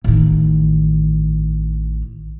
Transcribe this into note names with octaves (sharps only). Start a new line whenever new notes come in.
A1 D#3